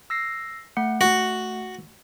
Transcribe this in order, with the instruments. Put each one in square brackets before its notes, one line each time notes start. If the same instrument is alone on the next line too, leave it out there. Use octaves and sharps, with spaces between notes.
[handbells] E6 A#6 C7
A3 F#5 C#7
[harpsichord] F#4